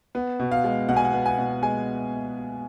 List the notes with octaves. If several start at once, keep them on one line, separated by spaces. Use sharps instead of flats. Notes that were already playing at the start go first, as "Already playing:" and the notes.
B3
B2
F5
G#3
B2 F#5
G#5
F#5
B3
G#5
B2
G#3 G#5